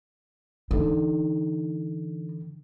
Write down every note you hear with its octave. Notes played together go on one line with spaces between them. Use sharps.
D3 E3 D#4